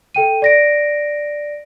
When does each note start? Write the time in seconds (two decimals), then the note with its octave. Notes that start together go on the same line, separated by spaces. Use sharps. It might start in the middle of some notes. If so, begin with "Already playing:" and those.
0.15 A4 G5 D#7
0.42 D5 A#6 D7